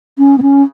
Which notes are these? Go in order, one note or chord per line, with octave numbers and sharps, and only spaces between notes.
C#4
B3
C#4